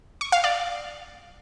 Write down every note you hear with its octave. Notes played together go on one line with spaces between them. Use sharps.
C#6
F5
D5